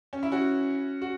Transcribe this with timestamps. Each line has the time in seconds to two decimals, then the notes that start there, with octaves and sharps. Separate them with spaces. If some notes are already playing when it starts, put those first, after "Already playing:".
0.13 C#4
0.23 E4
0.32 C#4 F#4
1.02 F#4